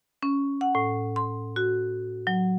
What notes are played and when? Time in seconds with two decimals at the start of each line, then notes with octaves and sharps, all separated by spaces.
0.23 C#4
0.61 F#5
0.75 A2
1.16 C6
1.56 F#4
2.27 F#3